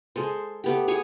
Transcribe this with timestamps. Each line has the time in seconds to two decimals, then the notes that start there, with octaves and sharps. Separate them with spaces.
0.16 G#3 A4 C5
0.64 A3 B3 G4
0.88 G#4 C#5 G#5